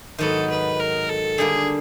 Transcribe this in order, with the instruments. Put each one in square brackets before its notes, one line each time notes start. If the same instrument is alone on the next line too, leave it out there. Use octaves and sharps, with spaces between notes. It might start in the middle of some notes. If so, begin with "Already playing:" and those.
[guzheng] G#2 D#3 F#3 B3 [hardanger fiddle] A4
[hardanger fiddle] B4
A#4
A4
[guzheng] D3 G3 A#3 D4 [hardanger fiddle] G#4